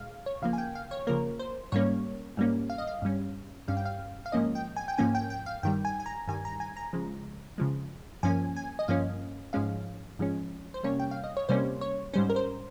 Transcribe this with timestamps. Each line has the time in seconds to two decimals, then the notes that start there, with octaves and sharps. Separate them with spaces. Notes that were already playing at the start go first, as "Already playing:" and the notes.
Already playing: A#2 G#3 F5
0.26 C#5
0.42 C#3 F3 A#3 F5
0.53 G#5
0.58 G5
0.75 F5
0.91 C#5
1.07 C#3 F3 A#3 A#4
1.39 C5
1.72 G#2 G3 A#3 C#4 C#5
2.37 G#2 G3 A#3 C#4
2.70 F5
2.78 D#5
2.87 F5
3.02 G2 G3 C#4
3.68 G2 G3 C#4 F5
3.77 G5
3.85 F5
4.26 F5
4.32 G#2 F3 A#3 C#4 D#5
4.55 G5
4.76 G#5
4.88 G5
4.98 G#2 F3 A#3 C#4 G#5
5.15 G5
5.30 G5
5.46 F5
5.63 G2 D#3 G3 G5
5.85 G#5
6.00 G#5
6.06 A#5
6.28 G2 D#3 G3 G#5
6.45 A#5
6.60 G#5
6.77 A#5
6.93 C#3 F3 G#3
7.58 C#3 F3 G#3
8.23 G2 F3 A#3 C#4 G#5
8.56 G#5
8.79 D#5
8.88 G2 F3 A#3 C#4 F5
9.53 G#2 F3 G#3 C#4 F5
10.19 G#2 F3 G#3 C#4
10.74 C5
10.83 C3 G3 A#3 C#4 C#5
10.99 G5
11.11 F5
11.24 D#5
11.37 C#5
11.49 C3 G3 A#3 C#4 C5
11.81 C#5
12.13 G#2 G3 C#4 C5
12.30 A#4
12.36 C5